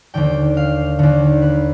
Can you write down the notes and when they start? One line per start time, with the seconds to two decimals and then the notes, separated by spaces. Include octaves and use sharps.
0.14 D#2 D3 G5
0.57 F5
0.99 D#2 D3
1.42 B4